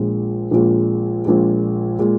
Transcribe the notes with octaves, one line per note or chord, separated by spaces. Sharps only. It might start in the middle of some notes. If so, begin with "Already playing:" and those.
Already playing: A#1 A#2 G#3
A#1 A#2 G#3
A#1 A#2 G#3
A#2 G#3